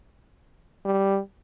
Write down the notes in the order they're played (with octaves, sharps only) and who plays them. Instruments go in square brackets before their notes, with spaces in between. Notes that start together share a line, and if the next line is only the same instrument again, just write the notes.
[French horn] G3